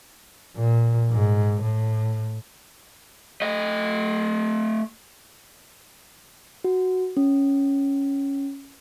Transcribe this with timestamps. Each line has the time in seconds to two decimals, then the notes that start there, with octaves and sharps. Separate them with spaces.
0.56 A#2
1.10 G#2
1.62 A2
3.42 A3 D#5
6.64 F#4
7.17 C#4